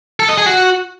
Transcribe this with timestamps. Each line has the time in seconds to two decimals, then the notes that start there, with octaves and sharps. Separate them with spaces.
0.20 A4
0.29 D#5
0.38 G#4
0.46 F#4